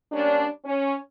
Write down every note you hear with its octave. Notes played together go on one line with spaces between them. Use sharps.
G3 A#3 C#4 D4
C#4